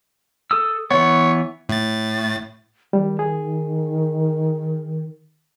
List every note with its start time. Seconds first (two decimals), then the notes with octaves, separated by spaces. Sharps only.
0.51 A4 D#6 E6
0.91 E3 B3 C#5
1.69 A2 A6
2.93 D#3 G3
3.19 G#4